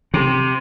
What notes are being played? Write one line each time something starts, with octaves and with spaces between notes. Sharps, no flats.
C3